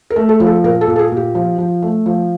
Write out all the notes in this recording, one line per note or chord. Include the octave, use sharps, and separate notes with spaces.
A#4
A3
A4
F3
A4
A#2 A#4
A4
A#2
A4
G#4
A#2 G4
F3
F3
A3
F3